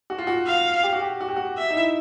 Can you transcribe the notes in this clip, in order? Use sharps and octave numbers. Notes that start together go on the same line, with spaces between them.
F#4
F4
F#4
F5
G4
F#4
G4
F#4
G4
F#4
E5
D#4
E4